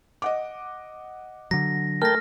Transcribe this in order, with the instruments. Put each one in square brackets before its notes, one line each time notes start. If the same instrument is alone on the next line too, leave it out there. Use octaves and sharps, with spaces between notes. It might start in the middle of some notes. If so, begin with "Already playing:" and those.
[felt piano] D#5 F#5 D6
[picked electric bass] D3 F#3 [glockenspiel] A#6
[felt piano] A3 [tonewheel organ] A#4 G5 A5 [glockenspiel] F6 A#6